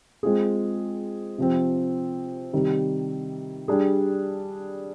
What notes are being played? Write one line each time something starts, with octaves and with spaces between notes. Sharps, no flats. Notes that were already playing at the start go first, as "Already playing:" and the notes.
G#3 C4 F4 G#4
C3 F3 C4
C3 D#3 G3
G3 D4 G#4